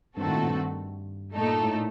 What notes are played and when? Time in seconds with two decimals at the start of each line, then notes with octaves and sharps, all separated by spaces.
0.17 G2 D#3 A3 C4 F#4 A4
0.27 A2
0.36 A#2
0.46 G2
1.35 A#2 A3 D#4 A4
1.64 A2